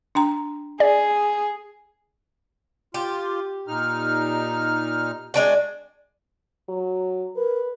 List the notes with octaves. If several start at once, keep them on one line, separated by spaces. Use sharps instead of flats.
D4 G5 A#5
G#4 D5
F4 G4
A#2 D#4 F6
G#3 C4 D4 F#4
F#3
A#4 B4